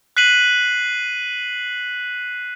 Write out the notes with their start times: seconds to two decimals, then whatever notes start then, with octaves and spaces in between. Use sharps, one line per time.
0.17 F#6 B6 C7 D#7 F#7